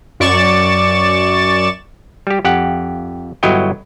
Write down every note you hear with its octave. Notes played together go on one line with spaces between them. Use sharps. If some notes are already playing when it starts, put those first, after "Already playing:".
F#2 D5 C#6 A6 E7
G3 G4
F2 G4 F#5
G1 F#3 E4 C#5 D#5 G5